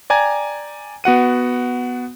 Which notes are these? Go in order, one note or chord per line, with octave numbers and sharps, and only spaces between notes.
D5 G5 G#5 A#5 G#6
B3 F#4 F#5 D#7